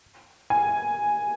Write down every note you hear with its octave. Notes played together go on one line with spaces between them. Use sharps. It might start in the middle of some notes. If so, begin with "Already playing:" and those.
G#5